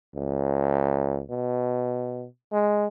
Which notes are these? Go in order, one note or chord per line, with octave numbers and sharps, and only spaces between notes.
C#2
B2
G#3